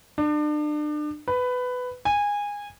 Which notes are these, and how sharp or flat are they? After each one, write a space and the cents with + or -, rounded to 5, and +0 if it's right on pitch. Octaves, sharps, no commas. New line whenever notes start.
D4 +35
B4 +15
G#5 -20